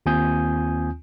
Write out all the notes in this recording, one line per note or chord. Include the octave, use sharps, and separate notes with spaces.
D#2 C4 F4 G#5 D#6 G6